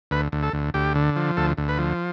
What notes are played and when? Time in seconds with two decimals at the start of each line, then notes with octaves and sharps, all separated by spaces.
0.11 D2 B4
0.32 D2
0.43 A4
0.53 D2
0.74 D2 G4
0.95 D3
1.16 F3
1.37 D2 A4
1.57 D2
1.69 B4
1.79 F3